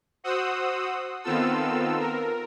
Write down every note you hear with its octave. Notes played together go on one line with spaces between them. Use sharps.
F#4 C5 F#5 D#6 E6
D#3 B3 C4 F4 A4 E6
A#4